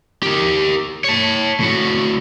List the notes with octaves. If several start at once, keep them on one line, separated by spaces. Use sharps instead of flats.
G4 A#4
C#5 A5
A2 F#4